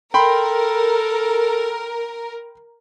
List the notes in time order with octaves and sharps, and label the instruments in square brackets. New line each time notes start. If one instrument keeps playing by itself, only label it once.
[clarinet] A4 [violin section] A#4 [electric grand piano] G5 B5 C6